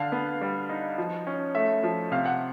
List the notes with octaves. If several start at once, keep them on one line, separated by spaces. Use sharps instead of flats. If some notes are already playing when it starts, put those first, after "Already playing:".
Already playing: D3 D4 F5
B3
G3
D#4
F3
C#4
A3 E5
F3
C3 F5
F#5